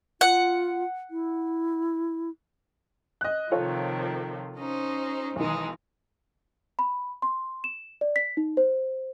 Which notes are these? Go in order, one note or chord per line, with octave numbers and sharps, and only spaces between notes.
F4 F#5
E4
D#5 F#6
C3 D#3 F3 F4 A4 C#5
C#4 D#4 C5
B1 D#3 E3 G#3 D#4
B5
C6
E7
D5
B6
D#4
C5